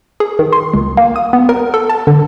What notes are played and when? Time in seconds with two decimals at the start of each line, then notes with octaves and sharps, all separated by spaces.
0.20 G#4
0.39 D#3
0.53 C6
0.74 C#2
0.97 A#3
1.16 D#6
1.33 B3
1.49 A#4
1.74 A4
1.89 A5
2.07 D3